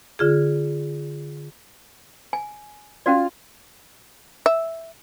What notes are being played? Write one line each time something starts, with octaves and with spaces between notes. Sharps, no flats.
D3 F4 G#4
G#5
C#4 F4 F#4 D5
E5